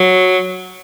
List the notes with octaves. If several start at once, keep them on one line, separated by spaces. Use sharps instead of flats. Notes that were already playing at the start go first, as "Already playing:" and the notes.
Already playing: F#3